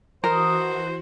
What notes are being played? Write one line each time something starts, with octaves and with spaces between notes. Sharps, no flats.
E3 D#4 F#4 A4 A#4 C5 D#5